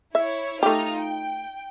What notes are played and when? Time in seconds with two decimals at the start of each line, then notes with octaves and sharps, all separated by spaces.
0.15 E4 C#5 E5
0.63 A3 D#4 F4 G4 F6
0.99 G5